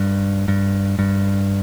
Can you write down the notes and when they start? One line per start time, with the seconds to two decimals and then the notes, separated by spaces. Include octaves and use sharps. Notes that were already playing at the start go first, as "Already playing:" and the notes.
Already playing: G2
0.48 G2
0.99 G2